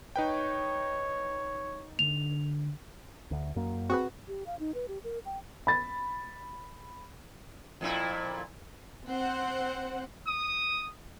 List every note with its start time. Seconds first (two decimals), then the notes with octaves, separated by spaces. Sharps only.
0.16 D#4 B4 C#5 G5
1.99 D3 F7
3.31 D2 D3
3.56 F#2 F#3 A#3
3.90 C4 F#4 G#4 B4
4.28 G4
4.46 F5
4.59 D#4
4.74 B4
4.88 G4
5.04 A#4
5.25 G5
5.67 B5 A6
7.81 F2 A#2 E4
9.07 C4 C5 F#5
10.27 D#6